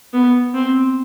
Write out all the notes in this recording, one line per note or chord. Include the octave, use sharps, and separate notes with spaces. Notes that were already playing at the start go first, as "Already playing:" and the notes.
B3
C4